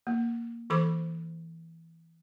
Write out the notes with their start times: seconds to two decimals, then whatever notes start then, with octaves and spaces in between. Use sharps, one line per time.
0.07 A#3
0.70 E3 A4 C5 B5 D6